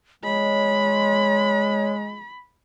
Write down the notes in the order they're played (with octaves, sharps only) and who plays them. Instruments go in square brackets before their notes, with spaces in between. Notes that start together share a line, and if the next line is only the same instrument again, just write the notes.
[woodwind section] G#3 [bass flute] C#5 [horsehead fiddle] B5